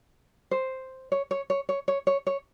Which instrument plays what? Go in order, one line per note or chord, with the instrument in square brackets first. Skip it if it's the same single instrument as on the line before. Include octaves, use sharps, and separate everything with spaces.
[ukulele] C5
C#5
C#5
C#5
C#5
C#5
C#5
C#5